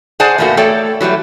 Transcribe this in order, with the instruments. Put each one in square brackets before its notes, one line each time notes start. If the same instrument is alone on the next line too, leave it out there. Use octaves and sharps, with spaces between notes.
[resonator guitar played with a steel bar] G#4 C5 D5 F#5 G#5 A5
E2 A#2 A3 A#3 F#4
A3 A4 C#5 D5 G5
E3 F#3 G3 A3